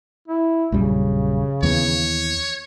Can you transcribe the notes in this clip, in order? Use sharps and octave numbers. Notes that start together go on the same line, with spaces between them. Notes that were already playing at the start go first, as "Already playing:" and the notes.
E4
A#1 F#2 C#3 G3
D#2 E3 B3 C#5